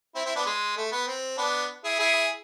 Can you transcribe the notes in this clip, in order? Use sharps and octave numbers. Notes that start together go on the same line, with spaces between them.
C4 E4
C4 E4
B3 D4
G#3
A3
B3
C4
B3 D4
E4 G#4
E4 G#4